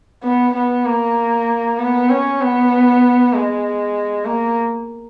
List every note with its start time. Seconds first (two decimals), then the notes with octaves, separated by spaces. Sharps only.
0.23 B3
0.54 B3
0.86 A#3
1.78 B3
2.10 C#4
2.41 B3
3.33 G#3
4.25 A#3